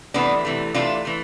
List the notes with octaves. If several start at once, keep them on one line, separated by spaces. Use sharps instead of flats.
C3 E3 A3 B3 D4
C3 E3 A3
C3 E3 A3 D4 F4
E3 A3